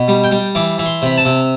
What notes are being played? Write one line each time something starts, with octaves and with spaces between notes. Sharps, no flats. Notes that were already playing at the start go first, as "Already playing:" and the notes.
Already playing: B2
G3
G5
G3
E3 D6
E3
C6
C3 B5
A5
C3